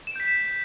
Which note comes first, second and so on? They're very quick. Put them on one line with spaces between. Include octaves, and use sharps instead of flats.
E7 D7 G6 B6